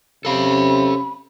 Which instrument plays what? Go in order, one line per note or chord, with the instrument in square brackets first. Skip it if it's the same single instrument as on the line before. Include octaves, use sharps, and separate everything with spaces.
[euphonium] C3 [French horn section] C#4 [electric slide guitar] A4 F5 [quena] B5